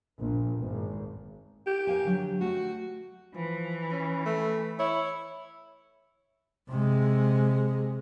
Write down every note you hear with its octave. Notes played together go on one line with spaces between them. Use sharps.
A#1
G#1
G4
A#4 F5 G#5
D3 F#3
A3 F#4
E3 F3
C#4
A3
E4 C#5
C3 G#3